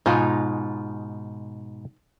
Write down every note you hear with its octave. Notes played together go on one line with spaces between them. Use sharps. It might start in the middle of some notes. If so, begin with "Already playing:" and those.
G#2 B2 G#3 D#4 F4 G#5